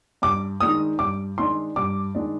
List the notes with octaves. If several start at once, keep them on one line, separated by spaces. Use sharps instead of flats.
G2 D6
D#3 G#3 D4 D#6
G2 D6
D#3 G#3 D4 C6
G2 D6
D#3 G#3 D4